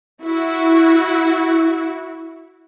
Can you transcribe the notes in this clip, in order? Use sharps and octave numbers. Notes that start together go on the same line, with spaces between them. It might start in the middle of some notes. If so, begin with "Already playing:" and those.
E4 F#4